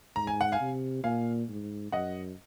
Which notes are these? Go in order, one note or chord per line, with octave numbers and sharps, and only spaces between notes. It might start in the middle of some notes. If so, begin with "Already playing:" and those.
G#2 A#5
G#5
F#5
F5 G#5
C3
A#2 F5 G#5
G#2
F#2 D#5 F#5